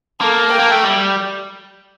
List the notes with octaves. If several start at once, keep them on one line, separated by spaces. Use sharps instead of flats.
A#3 A4
G5
A#3
A3
G3